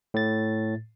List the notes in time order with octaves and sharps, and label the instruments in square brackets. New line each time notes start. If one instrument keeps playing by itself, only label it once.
[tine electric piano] A2 A6